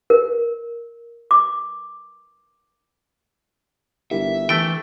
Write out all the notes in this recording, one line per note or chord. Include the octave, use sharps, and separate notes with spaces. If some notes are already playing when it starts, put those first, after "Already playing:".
A#4
D6
G1 E4 G4 A#4 E5
E3 A3 G5